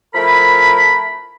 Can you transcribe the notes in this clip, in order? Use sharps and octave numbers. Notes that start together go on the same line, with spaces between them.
F3 A3 E4 A#4 B5